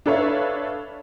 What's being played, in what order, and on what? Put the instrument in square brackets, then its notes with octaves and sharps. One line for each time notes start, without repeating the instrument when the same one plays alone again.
[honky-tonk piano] D4 A4 B4 C#5 E5 F5